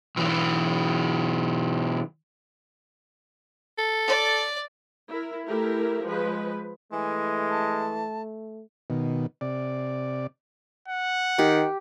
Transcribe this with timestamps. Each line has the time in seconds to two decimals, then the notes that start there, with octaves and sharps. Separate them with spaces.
0.16 B1 E3
3.78 A4
4.07 D5
5.09 E4 A#4
5.45 A3 E4 G4 A#4
6.05 F3 G#3 B4
6.92 E3 G#3 A3 G#5
7.49 A5
8.90 B2 D#3
9.41 C3 D5
10.88 F#5
11.39 D#3 G4